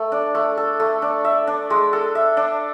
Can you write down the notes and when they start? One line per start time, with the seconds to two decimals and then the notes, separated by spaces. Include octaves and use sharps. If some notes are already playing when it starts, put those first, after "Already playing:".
Already playing: A3
0.12 D4
0.35 A3
0.57 A4
0.80 A3
1.02 D4
1.25 E5
1.47 D4
1.70 G#3
1.93 A4
2.15 E5
2.37 D4